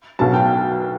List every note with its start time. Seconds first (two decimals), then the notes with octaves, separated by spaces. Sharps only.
0.19 B1 B2 F#3 A5
0.34 G5